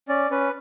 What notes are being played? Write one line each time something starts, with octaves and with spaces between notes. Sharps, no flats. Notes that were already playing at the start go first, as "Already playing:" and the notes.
C#4 D5
C#4 B4